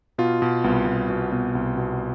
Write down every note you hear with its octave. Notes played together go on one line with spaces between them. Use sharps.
B2 F4
B2
C2 B3
C2
B2
B2
C2
B2